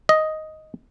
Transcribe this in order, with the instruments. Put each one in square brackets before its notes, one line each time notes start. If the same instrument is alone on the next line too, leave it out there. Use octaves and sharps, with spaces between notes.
[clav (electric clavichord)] D#5